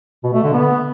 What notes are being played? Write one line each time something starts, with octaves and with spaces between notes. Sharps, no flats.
B2
A3
D3
B3